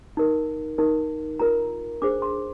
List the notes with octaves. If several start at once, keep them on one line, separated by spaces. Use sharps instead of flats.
D#4 A#4
D#4 A#4
F4 A#4 A#5
D4 G#4 C5 D6
C6